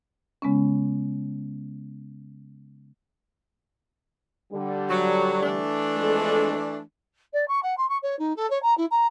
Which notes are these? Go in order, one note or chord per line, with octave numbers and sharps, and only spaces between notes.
C#3 G#3 B3 C#4
D3 G3
F#3
E3 A3 D4
F2 G#3 A4
D5
C#6
F#5
C6
C#6
C#5
D#4
A4
C#5
A#5
E4
A#5